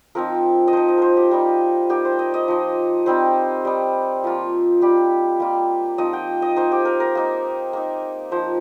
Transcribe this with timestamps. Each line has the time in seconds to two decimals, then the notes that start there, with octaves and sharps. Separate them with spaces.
0.15 F3 C4 D#4 A#4
0.68 D#5
0.73 F3 D#4 C5
0.88 D#5
0.98 A#4 C5
1.17 G4
1.31 G3 A#3 D#4 F4
1.90 A#3 D#4 G4
2.05 C5
2.19 D#5
2.34 D#5
2.48 F3 D#4
3.06 G3 C4 D#4 C5
3.65 G3 D#4
4.24 F3 A#3 F4
4.82 G3 D#4 G4
5.40 G3 A#3 F4
5.98 F3 C4 D#4 D#5
6.13 G5
6.42 D#5
6.56 A#3 D#4 C5
6.72 G4
6.85 A#4
7.00 A#4
7.15 A#3 D#4
7.73 A#3 D#4
8.32 F3 D#4 C5